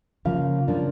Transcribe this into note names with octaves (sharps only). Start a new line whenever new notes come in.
C#3 F3 A#3 F5
C#3 F3 A#3 D4